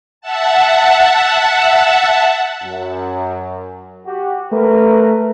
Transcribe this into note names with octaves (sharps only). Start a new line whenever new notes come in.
E5 F#5 A5
F#2
F#4 G4
A3 A#4 B4